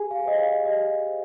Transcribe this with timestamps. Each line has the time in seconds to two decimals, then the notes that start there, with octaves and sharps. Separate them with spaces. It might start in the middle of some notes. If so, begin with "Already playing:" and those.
Already playing: G4 G#4 G#5
0.11 F5
0.25 C5 D#5
0.39 F5
0.65 G4 D#5
1.07 C5